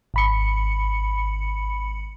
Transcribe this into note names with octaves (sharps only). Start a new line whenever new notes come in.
G#1 B5 C#7